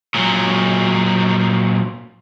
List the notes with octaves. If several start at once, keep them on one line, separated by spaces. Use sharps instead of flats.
A#2 F#3